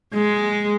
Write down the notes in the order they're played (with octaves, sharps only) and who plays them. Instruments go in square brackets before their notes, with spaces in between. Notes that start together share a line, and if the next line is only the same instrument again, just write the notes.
[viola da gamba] G#3